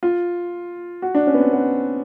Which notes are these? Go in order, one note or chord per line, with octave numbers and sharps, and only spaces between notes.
F4
F#4
D4
C#4
B3
C4
B3